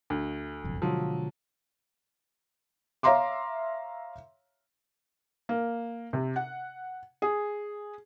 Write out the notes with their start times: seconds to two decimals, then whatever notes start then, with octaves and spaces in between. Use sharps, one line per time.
0.10 D2
0.64 F#1 B1 F2
0.82 B2 D3 F3 F#3 G#3
3.03 C#5 E5 F5 A#5 C6 D6
5.49 A#3
6.13 C3
6.36 F#5
7.22 G#4